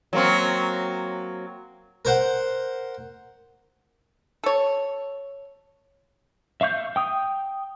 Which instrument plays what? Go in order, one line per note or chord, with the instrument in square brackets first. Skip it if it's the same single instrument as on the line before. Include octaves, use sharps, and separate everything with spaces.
[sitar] F#3 A#3 C4
[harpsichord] A#4 C5 F#5
[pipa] A4 C#5
[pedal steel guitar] E5 F5 C#6 G6
G5 D#6